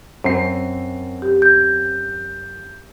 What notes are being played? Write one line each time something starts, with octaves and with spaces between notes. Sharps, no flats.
F#2 C4 C7
G4
G6